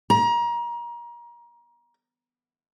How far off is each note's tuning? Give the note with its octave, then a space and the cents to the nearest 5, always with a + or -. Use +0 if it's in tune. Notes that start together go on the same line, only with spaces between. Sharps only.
A#5 +30